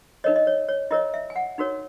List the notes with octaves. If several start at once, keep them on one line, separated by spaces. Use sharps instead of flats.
D#4 A#4 C#5 D#5
D#5
C#5
C#5
E4 A#4 C#5 D#5
E5
G#5
F#5
D#4 F#4 A#4 C#5